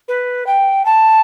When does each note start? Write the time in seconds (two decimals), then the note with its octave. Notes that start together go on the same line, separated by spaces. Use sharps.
0.08 B4
0.47 G5
0.86 A5